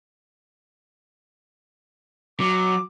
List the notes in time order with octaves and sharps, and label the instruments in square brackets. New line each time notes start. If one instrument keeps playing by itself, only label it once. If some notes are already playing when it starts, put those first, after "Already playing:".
[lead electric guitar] F#3 [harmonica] D6